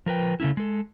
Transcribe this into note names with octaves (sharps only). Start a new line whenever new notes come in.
F3 A#4 B4 G5
C#3 A3 C#4 E4
G#3 A4